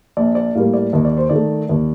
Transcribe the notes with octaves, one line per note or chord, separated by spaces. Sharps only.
A#1 D5
D5
A2 G3 A#3 F5
D5
D#2 D#5
D5
C5
D#3 D5
A3
D#2